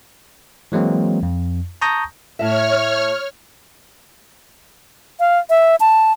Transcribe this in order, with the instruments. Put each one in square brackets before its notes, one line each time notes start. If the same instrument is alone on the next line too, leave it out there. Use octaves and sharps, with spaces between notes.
[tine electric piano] E3 F#3 G#3 A#3 C4
F2
A5 A#5 C#6 D#6 G6 A#6
[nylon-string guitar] A2 E5 [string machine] C#5 F6
[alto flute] F5
E5
A5